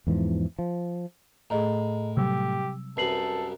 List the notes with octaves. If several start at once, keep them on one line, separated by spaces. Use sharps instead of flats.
E2 G#2 E3 F3
F3
A2 G#4 D#5 A#5
C3 F#3 G3 G4 E6
C2 F#2 A4 B4 C7 F#7